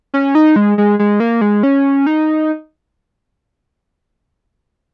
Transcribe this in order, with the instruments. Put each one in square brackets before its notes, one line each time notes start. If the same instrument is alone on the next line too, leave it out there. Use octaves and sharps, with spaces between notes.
[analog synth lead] C#4
D#4
G#3
G#3
G#3
A#3
G#3
C#4
D#4